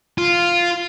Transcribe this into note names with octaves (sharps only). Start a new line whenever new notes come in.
F4